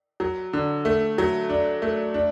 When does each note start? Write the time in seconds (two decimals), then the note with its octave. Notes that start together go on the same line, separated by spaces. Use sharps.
0.20 F#3
0.53 D3
0.85 A3
1.18 F#3
1.49 D4
1.82 A3
2.14 D4